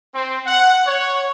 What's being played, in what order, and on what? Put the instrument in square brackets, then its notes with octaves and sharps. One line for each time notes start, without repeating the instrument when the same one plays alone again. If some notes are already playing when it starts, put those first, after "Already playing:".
[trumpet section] C4
F#5
C#5